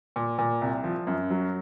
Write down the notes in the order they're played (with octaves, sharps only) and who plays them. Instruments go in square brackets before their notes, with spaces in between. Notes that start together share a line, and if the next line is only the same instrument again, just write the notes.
[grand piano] A#2
A#2
C2
F3
F#2
F#3